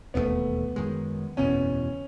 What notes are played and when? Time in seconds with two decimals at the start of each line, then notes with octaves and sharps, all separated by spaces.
0.14 E1 D#2 D#3 A3 B3
0.76 F#2 D#3 G#3
1.37 F#1 E2 B2 C#4